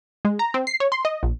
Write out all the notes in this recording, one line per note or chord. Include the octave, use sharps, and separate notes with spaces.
G#3
A#5
C4
C7
C#5
C6
D#5
A#1